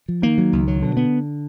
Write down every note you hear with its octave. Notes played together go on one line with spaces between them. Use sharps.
F3
D#3 A#3
F#3
C#2
F#3
B2 D3
B3